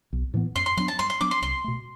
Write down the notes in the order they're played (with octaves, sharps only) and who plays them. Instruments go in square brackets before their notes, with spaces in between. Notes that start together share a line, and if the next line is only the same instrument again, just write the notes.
[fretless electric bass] B1
A2 E3 B3
[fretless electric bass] F#2 [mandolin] C6
[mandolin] C6
[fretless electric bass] F#3 B3 D4 [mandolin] C6
[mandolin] A5
[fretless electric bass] G2 [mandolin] C6
[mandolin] C6
[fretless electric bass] F#3 B3 D4 [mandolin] D6
[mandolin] C6
[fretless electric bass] C2 [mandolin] C6
[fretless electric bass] B2 A3